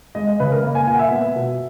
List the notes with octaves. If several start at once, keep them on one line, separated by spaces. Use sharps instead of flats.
G#3 D#5
D#5
C#3 B4
A#4
A#3 A#4
G#5
A#2 G#5
F#5
E5
B3
B2